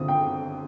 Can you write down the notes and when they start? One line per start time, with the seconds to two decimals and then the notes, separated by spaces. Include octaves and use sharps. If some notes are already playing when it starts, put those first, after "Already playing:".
Already playing: D3 C4 F4 D#6
0.08 G5